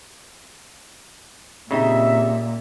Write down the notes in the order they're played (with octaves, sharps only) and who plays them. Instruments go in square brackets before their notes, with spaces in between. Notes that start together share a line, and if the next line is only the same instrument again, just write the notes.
[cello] A#2 [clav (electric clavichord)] C#3 D#4 [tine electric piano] C4 G4 G5 [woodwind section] E5